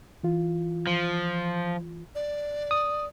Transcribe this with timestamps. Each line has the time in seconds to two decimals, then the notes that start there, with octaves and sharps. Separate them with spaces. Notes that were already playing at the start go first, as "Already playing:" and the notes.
0.23 E3 F4
0.87 F3
2.15 D5
2.71 D#6